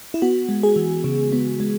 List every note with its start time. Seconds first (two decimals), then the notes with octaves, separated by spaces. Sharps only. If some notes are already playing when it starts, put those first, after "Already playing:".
0.14 E4
0.22 B3 F#4
0.49 G#3
0.63 G#4
0.76 E3
1.04 C#3
1.32 B3
1.60 G#3